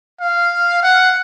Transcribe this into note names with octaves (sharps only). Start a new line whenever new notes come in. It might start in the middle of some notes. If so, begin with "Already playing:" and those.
F5
F#5